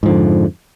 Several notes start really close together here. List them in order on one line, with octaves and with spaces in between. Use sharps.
G#2 F3 D3 F2